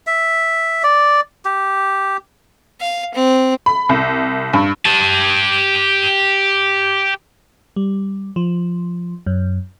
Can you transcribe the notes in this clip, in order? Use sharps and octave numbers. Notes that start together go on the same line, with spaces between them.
E5
D5
G4
F5
C4
B5
C2
G2
G4 A5
G3
F3
F#2